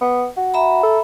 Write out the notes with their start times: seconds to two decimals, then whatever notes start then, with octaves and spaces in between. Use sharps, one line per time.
0.01 B3
0.37 F#4
0.54 E5 A#5 B5
0.83 A4